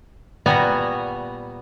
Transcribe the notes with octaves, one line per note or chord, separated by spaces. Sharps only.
A#2 G3 B3 F#4 G#5 A#5